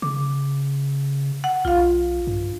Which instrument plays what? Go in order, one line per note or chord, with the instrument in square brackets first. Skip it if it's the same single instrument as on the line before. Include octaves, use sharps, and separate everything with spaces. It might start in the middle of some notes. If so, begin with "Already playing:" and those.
[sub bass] C#3 [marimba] D6
[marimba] F#5
[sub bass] B1 [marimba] F4 F5
[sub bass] G2